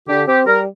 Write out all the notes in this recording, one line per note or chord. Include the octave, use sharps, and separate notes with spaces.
D3 G4
C4 G4
G3 A#4